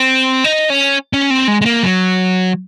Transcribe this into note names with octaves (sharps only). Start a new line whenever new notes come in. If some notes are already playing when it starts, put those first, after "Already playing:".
Already playing: C4
D#4
C#4
C#4
C4
G#3
G#3
A#3
F#3